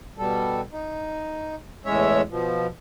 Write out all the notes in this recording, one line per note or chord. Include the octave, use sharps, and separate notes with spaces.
B2 G3 A4
D#4
E2 A2 G#3 C#4 C#5 E5
B2 F3